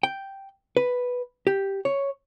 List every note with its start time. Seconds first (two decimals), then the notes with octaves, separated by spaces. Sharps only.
0.03 G5
0.77 B4
1.47 G4
1.85 C#5